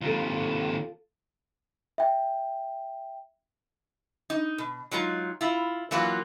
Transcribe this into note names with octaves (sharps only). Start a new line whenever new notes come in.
D#2 C3 F4 A4
E5 G5
D#4
B2
F#3 G#3 D#4 F4
E4 F4
E3 F#3 A#3 F4 F#4